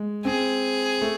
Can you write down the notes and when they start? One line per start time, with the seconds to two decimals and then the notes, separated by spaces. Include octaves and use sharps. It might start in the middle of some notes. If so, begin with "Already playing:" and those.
Already playing: G#3
0.25 C4 G#4
1.02 A3